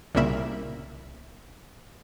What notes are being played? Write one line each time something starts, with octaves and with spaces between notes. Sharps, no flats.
C2 A#2 C#3 A#3 E5 B5